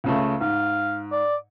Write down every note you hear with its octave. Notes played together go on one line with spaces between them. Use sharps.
C#2 C#3 A3
G#2 F5
D5